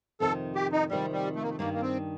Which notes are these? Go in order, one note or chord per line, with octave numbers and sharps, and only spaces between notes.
F2 C3 D#3 A4
G4
D#4
F2 C3 D#3 G3
G3
A3
A#3
A3
G2 D#3 G3 A#3
A#3
C4